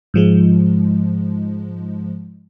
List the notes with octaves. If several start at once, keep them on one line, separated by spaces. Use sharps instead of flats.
G#2 F3 G#3